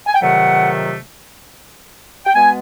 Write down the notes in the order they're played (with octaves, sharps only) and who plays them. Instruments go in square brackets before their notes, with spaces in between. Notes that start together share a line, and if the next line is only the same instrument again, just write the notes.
[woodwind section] G#5
G5
F2 C3 D#3 F#3 A3 F#5
G5
B2 G#3 B3 G#5